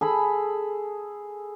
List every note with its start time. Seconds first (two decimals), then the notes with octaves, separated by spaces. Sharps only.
0.01 G#4 A4 B5